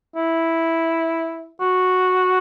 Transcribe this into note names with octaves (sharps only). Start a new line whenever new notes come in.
E4
F#4